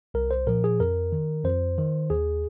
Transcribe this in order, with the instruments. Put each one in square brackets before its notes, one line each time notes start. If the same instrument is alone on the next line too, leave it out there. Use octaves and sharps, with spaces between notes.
[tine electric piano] C2 A#4
C5
A#2 F3 A#4
G#4
F2 A#4
D#3
F2 C5
D#3
D#2 G#4